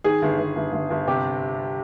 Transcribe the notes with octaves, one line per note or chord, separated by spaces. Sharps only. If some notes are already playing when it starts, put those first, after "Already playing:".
D#3 G#4
G1
G1
G1
G1
G1
C3 G4